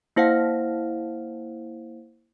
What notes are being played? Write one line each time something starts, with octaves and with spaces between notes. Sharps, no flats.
A#3 E4 C5 F5 F#5